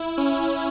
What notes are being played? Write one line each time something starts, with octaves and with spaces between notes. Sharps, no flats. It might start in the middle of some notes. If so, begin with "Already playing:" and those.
Already playing: E4
C#4